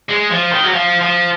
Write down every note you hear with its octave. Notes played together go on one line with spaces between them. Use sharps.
G#3
F3
D#3
F#3
F3
F3